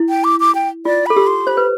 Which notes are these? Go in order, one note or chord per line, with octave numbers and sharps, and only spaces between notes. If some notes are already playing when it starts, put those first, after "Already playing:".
Already playing: E4
G5
D6
D6
G5
F4 D5
A4 B5
G4
C6
C5 B5
B4